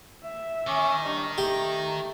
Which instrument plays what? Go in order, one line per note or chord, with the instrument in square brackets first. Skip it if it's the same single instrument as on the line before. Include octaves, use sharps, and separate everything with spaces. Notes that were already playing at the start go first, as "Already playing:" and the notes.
[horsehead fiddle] E5
[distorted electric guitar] D#3 [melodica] C#4 C#6 D6
[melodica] G3 C#6 [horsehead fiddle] D4 D#5
[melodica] A3 [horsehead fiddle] D#4 A#5 [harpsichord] G4